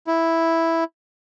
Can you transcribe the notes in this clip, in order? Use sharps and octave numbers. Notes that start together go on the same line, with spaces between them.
E4